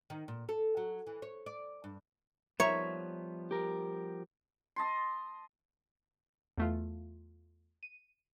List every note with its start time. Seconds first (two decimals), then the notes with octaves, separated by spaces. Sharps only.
0.10 D#3
0.28 A#2
0.49 A4
0.77 F#3
1.07 E3
1.22 C#5
1.46 D5
1.84 G2
2.60 F3 G3 B3 C#5 E5 A#5
3.51 G4 A#4
4.76 D#5 A5 C6
6.57 E2 A3 F4
7.83 D#7